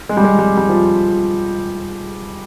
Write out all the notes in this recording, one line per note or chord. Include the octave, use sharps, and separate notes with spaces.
G#3
G3
G#3
G3
G3
F3